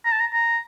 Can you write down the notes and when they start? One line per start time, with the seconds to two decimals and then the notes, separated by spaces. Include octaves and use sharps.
0.05 A#5
0.12 A5
0.20 A#5
0.33 A#5